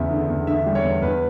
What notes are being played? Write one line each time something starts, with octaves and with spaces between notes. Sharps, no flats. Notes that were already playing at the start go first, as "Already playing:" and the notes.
Already playing: E2 C#3 E5
D3
E2
D3 E5
G3
C#5
E2
E2 B4